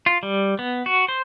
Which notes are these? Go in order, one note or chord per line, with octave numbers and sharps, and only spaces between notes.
F4
G3
B3
F#4
C5